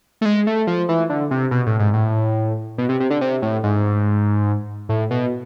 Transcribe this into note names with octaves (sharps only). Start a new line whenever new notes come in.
A3
G#3
A3
F3
E3
D3
C3
B2
A2
G#2
A2
B2
C3
C3
D3
C3
A2
G#2
A2
B2